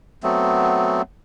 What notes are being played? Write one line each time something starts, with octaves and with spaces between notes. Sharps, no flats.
F#3 A3 B3 C4